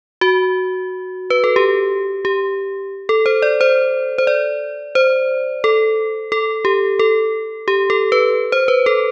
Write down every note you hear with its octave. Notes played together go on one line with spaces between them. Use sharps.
F#4
B4
A4
G4
G4
A4
C5
D5
C5
C5
D5
C5
A4
A4
G4
A4
G4
A4
B4
C5
B4
A4